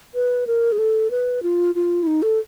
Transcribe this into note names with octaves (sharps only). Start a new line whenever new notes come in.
B4
A#4
G#4
A4
B4
F4
F4
E4
D#4
A4